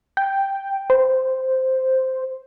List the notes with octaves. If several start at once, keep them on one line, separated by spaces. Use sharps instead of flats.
G5
C5